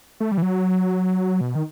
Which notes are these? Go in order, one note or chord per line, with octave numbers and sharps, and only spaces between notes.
A3
G3
E3
F#3
B2
D#3